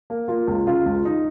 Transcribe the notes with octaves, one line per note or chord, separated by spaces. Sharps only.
A#3
A#3 F4
C#2
C#3 F4
C#2
D#4